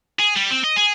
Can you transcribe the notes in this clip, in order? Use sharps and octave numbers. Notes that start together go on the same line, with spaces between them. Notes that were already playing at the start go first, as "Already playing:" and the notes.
G#4
G3
C4
D#5
G#4